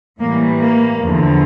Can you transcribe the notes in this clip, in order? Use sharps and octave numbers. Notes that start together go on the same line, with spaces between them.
A2 E3 G3 A#3
A#3
E2 D3 F3